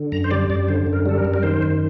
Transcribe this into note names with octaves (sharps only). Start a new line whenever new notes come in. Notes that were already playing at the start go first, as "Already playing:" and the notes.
Already playing: D3
F#2 A#5
C5
G3 D5
F#2 D5
D3 C5
F#2
A#4
G3 A4
A#4
F#2
A#4
D#3 C5
F#2